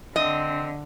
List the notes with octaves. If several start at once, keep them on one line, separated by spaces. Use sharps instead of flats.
D3 C4 D#5